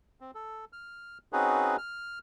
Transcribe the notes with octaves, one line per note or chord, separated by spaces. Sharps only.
C4
A4
F6
C4 C#4 D#4 F#4 G#4 B4
F6